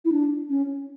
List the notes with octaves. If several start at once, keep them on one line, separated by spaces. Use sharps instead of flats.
E4
D4
C#4